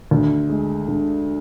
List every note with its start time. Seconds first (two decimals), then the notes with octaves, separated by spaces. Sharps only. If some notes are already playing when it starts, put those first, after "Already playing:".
0.11 D2
0.50 G#3
0.88 D3